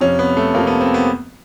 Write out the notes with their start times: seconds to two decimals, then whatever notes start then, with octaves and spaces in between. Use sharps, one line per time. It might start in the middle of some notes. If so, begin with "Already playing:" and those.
0.01 F2 C3 F3 C#4
0.19 B3
0.37 A3
0.54 F2 C3 F3 A#3
0.67 B3
0.80 C4
0.94 B3